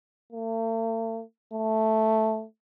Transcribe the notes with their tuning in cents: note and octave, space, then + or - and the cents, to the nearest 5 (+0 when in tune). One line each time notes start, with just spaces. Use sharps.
A3 +45
A3 +0